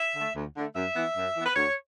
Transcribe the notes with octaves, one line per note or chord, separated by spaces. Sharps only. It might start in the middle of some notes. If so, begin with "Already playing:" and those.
Already playing: E5
D3 A3
D2
D3 A3
F#2 E5
E3 B3
F#2
E3 B3
B4
D2 C#5